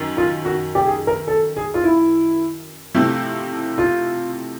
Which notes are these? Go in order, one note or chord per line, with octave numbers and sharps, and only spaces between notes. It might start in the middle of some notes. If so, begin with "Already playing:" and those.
Already playing: F#2 D#3
F4
F#4
G4
G#4
A#4
A4
G#4
F4
E4
C3 F3 A3 C4 E4
F4